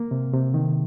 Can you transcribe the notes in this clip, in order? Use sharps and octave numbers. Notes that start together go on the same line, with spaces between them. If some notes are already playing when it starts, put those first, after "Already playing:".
Already playing: A#3
C3
C3
D#3